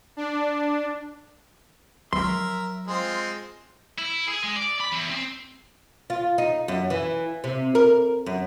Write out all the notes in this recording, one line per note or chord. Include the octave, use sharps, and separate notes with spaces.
D4
F3 F#3 A#4 E5 C6
G#3 C4 F4
E4
G#4
G#3
D5
B5
E2
C4
F4
D#4
F#2
E3
C3
A#4
F#2